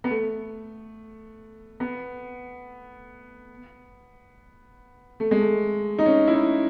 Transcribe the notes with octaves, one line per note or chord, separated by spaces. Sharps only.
B3
A3
B3
A3
G#3
A3
D#4
C#4
E4
D#4